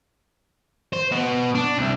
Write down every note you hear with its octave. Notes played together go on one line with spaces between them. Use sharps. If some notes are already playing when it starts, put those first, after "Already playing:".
C5
B2
D4
C2